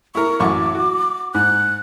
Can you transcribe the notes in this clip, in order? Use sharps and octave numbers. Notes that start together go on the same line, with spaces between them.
E4 A#4 C#6
A1 F#2 C#6 D6
F#4
G#2 F#6